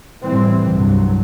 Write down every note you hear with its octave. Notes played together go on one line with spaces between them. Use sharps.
A2 E3 G3 C4
C2 G2 F#3